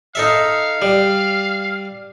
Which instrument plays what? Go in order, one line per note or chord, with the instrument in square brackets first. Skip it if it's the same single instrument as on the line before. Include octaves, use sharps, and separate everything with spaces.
[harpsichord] D#4 A4 E5 [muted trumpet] F5
[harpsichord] G3